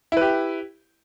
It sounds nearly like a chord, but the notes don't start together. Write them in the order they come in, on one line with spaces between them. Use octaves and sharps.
E4 B4 G4